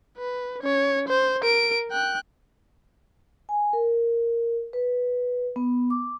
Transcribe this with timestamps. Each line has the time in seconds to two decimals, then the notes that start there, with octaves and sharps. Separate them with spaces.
0.18 B4
0.61 C#4 C#5
1.08 C5
1.43 A#4 D7
1.91 G5 F#6
3.49 G#5
3.73 A#4
4.73 B4
5.56 B3
5.90 D6